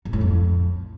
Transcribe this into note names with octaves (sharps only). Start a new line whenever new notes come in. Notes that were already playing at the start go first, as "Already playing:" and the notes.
B2
A2
F2